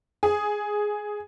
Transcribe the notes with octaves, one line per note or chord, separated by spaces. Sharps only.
G#4